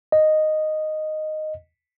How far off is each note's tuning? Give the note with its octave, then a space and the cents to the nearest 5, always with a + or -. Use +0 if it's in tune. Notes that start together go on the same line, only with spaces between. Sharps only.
D#5 -5